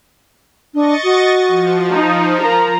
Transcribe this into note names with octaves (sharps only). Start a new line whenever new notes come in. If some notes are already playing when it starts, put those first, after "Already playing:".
D4 D#5 C#6 A6
F#4
F3
D#4
A#4 A#5